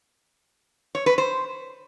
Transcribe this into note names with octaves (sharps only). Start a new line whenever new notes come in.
C#5
B4
C5